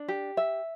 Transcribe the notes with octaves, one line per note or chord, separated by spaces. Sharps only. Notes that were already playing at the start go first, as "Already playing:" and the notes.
Already playing: D4
G4
E5